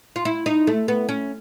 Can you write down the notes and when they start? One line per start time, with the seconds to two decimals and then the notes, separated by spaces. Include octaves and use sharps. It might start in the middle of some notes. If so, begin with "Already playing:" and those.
0.16 F4
0.25 E4
0.46 D#4
0.67 A3
0.88 B3
1.09 C#4